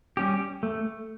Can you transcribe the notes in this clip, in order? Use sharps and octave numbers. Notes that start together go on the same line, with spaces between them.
G3 C#4 G4
A3